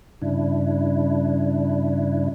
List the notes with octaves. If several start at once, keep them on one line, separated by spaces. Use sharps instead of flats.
G2 C#3 D4 E4